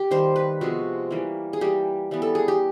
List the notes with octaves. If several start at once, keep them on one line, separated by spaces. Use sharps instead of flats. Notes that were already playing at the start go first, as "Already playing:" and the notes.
Already playing: G4
D#3 G3 A#3 C5
B4
C3 F3 G#3 B3 F#4
E3 G3 A#3
G#4
E3 G3 A#3 G4
E3 G3 B3
A4
G#4
G4